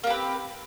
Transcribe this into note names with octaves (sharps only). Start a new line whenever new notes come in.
A#3 C4 G4 B4